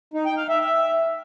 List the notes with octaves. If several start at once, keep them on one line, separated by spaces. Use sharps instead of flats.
D#4
G5
F5
E5
E5